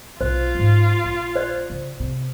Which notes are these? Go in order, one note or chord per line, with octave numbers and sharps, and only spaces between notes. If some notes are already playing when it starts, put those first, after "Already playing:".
B1 F4 C5
G#2 C#4
A#1
C5 D5
C#3
C3